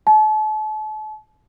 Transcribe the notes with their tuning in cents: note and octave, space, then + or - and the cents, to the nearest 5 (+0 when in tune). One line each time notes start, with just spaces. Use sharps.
A5 -40